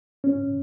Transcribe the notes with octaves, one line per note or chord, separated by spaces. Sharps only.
C#4